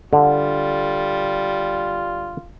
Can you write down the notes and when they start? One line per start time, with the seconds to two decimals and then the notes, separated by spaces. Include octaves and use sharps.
0.13 D3 G3 F4